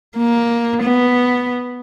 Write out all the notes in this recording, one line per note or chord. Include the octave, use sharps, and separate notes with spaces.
A#3
B3